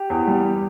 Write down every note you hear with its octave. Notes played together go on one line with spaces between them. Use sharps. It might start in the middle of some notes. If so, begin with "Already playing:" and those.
Already playing: G4
E2
G3